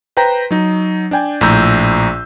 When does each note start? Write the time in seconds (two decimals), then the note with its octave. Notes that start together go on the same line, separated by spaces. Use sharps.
0.17 B4 C5 G5 A#5
0.51 F#3 D#4
1.11 D4 D5 G5 G#5
1.41 A#1 A2 A#5 E6 G6